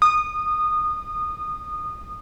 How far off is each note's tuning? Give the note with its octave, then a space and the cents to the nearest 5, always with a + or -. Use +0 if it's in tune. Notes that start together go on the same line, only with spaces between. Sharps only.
D#6 -20